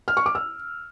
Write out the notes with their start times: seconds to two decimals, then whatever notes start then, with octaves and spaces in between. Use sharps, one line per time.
0.08 F6
0.17 C#6
0.26 D6
0.35 E6